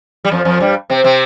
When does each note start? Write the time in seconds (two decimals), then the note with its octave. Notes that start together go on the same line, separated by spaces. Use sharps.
0.25 G3
0.31 F2 F3
0.45 F2 F3
0.60 G2 G3
0.90 C3 C4
1.04 C3 C4